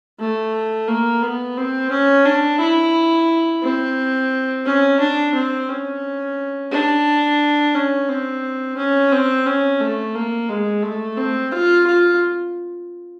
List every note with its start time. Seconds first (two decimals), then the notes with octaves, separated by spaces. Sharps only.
0.20 A3
0.88 A#3
1.22 B3
1.57 C4
1.91 C#4
2.25 D4
2.60 E4
3.63 C4
4.65 C#4
5.00 D4
5.34 C4
5.69 C#4
6.71 D4
7.74 C#4
8.08 C4
8.77 C#4
9.12 C4
9.46 C#4
9.80 A3
10.15 A#3
10.49 G#3
10.83 A3
11.18 C4
11.52 F4
11.86 F4